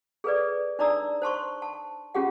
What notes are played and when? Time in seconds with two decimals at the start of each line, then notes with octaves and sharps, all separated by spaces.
0.24 G#4 A4 B4 D5
0.79 D4 D#4 D5 A#5 D#6 E6
1.22 C5 A5 C6 C#6
1.62 A5
2.15 C#4 F4 G4 G#4 F#5